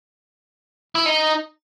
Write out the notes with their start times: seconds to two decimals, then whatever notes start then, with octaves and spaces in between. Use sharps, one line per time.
0.95 E4
1.06 D#4